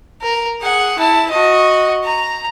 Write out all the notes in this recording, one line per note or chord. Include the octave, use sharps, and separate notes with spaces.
A#4
G#4 F#5
E4 A5
F#4 D#5
A#5